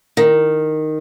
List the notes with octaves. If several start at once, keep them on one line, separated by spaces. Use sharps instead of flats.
D#3